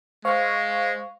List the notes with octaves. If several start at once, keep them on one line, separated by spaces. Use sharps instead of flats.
G#3 C5 F5 C#6